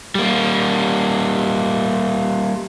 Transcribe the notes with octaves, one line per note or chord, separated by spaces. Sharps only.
G3 A#3